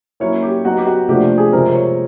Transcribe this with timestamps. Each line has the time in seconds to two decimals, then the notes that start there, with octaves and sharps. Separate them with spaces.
0.20 F#3 A#3 C#4 E4 C#5
0.43 G4
0.64 F#3 B3 D#4 F#4
0.78 G4
0.87 F#4
1.08 C3 F3 A3 D4 G4
1.38 G#4
1.52 C3 F3 G#3 C4 A#4
1.75 C#5